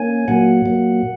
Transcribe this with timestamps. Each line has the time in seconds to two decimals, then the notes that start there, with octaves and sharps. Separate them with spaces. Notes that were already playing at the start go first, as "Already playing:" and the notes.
Already playing: A#3 C#4 G#5
0.28 A#2 F#3 A#3 F#5
0.66 A#2 F#3 A#3